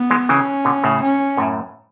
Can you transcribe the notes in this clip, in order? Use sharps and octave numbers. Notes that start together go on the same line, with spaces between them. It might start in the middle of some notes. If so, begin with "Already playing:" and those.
Already playing: B3
E3 G#3
C#3 E3 C#4
B2 D3
A2 C#3
C#4
F#2 A2